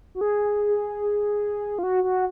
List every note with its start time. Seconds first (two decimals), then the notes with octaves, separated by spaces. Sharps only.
0.15 F#4
0.21 G#4
1.79 F4
1.83 F#4
2.04 F#4